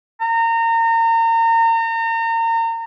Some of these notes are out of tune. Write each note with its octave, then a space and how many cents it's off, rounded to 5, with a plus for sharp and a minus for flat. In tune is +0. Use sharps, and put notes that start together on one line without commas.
A#5 -35